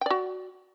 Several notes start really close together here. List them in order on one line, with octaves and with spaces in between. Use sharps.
G5 D5 F#4